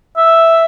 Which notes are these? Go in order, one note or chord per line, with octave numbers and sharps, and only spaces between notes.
E5